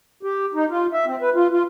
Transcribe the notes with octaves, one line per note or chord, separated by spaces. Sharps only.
G4
D#4
F4
E5
C4
B4
F4
F4